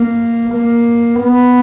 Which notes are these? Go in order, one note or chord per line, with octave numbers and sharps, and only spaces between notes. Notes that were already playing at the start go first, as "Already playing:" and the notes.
Already playing: A#3
A#3
B3